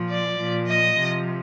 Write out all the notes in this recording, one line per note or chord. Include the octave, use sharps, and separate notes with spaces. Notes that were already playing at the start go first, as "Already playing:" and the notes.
Already playing: A#2 F3
D5
A#2 F3
D#5
C3 F3